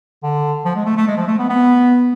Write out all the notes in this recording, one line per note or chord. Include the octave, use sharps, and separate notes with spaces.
D3
F3
G#3
A3
A3
G#3
F3
A3
B3
B3